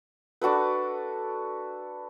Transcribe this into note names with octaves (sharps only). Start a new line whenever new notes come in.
D4 F#4 A4 B4